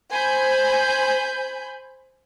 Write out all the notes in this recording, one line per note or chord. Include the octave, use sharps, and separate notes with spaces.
C5 G#5 B5 G6